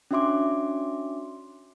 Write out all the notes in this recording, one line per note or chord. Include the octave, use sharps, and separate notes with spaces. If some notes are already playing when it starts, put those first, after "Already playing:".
C#4 D4 F#4 E5 C6 D6